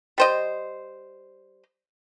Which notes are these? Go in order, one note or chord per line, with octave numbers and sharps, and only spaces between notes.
G3 C5 D#5